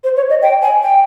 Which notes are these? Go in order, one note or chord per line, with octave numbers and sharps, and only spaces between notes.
C5
C#5
D#5
G5
G#5
G5